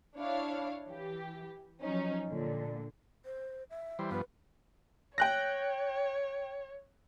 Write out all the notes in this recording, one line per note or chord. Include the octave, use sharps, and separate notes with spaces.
D4 E4 C#5 F5
E3 G4
F3 F#3 C#4 D#4
A#2 D3
C5
E5
E3 G3 C5
G2 F3 B3 B4
C#5 G5 F#6 A#6